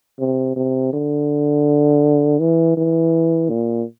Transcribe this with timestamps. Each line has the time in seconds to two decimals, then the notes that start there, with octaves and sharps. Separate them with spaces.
0.19 C3
0.56 C3
0.93 D3
2.40 E3
2.77 E3
3.50 A#2